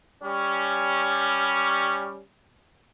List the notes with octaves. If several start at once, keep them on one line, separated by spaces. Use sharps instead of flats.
G3 C#4